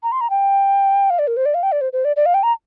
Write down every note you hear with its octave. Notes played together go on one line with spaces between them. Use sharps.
A#5
C6
A#5
G5
F5
D5
A#4
C5
D5
F5
G5
D5
C5
C5
D5
D5
F5
G5
A#5